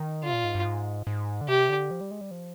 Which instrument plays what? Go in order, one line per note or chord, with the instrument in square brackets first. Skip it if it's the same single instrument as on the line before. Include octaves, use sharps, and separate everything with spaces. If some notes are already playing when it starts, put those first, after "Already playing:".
Already playing: [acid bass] D#3
[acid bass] D3 [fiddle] F4
[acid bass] C3
A#2
G#2
G2
G#2
G#2
D3
[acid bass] C3 [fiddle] G4
[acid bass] D3
F3
G3
G#3
G3
F3